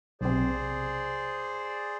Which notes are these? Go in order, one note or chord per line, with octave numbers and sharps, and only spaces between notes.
B1 C3 G#4 C5 D5